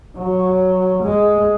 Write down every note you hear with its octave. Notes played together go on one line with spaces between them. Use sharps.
F#3
G#3